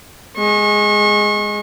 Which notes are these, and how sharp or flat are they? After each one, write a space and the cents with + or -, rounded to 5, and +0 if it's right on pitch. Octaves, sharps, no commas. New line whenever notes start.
G#3 +0 C#6 -35